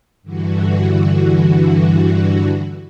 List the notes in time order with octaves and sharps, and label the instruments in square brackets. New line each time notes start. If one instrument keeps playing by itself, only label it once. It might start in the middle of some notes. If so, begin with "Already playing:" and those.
[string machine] G2 D3 E3 F#4